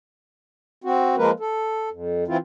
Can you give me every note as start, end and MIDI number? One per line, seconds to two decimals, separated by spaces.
0.84 1.16 60
0.84 1.16 66
1.17 1.31 53
1.17 1.31 56
1.17 1.31 58
1.17 1.31 70
1.17 1.31 71
1.40 1.89 69
1.90 2.24 41
2.28 2.37 52
2.28 2.37 60
2.28 2.37 64
2.28 2.37 65